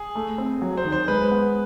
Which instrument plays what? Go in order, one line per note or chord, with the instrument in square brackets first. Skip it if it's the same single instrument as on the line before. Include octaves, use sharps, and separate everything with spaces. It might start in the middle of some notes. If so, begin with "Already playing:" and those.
Already playing: [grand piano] G#4
[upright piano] A3
C4
F#3
[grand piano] C5
[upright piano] D#3
[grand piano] C5
[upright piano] G#3 [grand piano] B4
[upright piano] B3